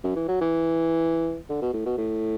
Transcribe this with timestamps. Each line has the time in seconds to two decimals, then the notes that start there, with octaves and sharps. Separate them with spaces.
0.04 F#2
0.16 E3
0.28 F#3
0.41 E3
1.50 D3
1.62 B2
1.73 A2
1.85 B2
1.98 A2